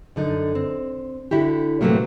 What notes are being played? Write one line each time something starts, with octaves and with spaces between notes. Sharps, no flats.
F#2 D3 D#4
C4
D3 E4 F#4 G4
A2 C3 E3 F#3 A3 A#3